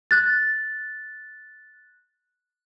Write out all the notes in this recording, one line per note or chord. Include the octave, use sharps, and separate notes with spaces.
F#6 A6